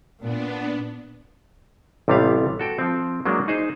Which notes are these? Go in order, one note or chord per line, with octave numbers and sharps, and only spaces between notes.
A#2 B3 D4
A1 C3 G3 B3 F5
F#4 A4 G5
F3 C4
F#3 G#3 A#3 D4
D#4 G#4 C5